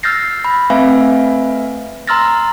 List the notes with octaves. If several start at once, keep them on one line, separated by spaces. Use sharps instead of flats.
E6 F6 G6 A6 A#6 C7
B5
A3 C4 B4 E5 F5 G#5
A#5 C6 E6 F6 A6 A#6